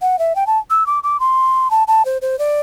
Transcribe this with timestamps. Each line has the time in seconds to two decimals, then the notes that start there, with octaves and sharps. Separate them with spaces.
0.01 F#5
0.19 E5
0.35 G5
0.47 A5
0.70 E6
0.86 D6
1.03 D6
1.20 C6
1.71 A5
1.88 A5
2.05 C5
2.22 C5
2.39 D5